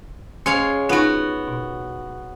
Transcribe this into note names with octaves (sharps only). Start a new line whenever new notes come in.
G#3 C#4 C#5 F5
B3 D#4 F4 F#4
B2